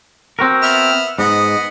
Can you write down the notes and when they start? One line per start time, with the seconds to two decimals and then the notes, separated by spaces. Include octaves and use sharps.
0.39 C4 F#4 A#4
0.62 B3 E5 F6
1.19 G#2 B3 D#5 F#5